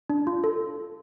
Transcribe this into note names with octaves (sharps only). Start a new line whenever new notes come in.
D4
F4
A4